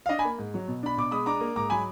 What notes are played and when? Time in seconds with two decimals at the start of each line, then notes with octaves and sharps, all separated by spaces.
0.06 F5
0.09 D4 D#5
0.19 G#5 B5
0.25 A#3
0.38 G#2
0.54 F#3
0.68 B2
0.83 D4 B5
0.97 B2 D6
1.11 G#3 B5 D#6
1.26 D4 A#5 D6
1.41 A#3
1.56 G#2 A#5 D6
1.70 F#3 G#5 B5